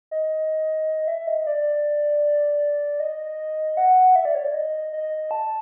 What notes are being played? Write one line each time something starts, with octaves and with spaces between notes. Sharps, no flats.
D#5
E5
D#5
D5
D#5
F#5
E5
D5
C#5
D5
D#5
D#5
A5